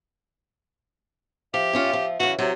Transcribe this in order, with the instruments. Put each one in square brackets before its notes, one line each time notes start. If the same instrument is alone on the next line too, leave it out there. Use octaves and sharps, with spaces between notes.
[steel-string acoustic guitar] F3 [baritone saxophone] G4 [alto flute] E5
[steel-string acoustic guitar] A#2 C#4 F4
F3
[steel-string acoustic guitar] C#3 E3 [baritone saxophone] F#4
[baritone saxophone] C3 [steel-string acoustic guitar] F#3